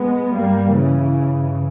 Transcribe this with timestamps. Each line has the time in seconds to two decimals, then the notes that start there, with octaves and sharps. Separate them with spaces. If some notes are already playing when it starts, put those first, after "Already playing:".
Already playing: G#3 B3
0.33 G2 G3 A#3
0.73 C#3 E3
1.13 G2